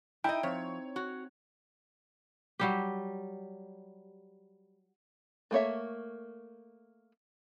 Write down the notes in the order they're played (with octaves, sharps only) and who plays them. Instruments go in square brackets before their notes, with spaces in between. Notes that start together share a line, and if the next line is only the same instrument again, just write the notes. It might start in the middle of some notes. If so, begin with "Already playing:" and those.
[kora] D#4 [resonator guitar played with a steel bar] E4 D#5 [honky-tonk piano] G5
[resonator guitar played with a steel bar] F3 [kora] C4 [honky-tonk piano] C#5
[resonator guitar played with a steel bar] F#4
[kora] F#3 G3 G4
[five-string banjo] A3 A#3 C#5 E5